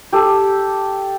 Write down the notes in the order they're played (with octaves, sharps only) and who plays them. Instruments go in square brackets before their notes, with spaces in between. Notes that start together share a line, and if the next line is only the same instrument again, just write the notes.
[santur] G4 A4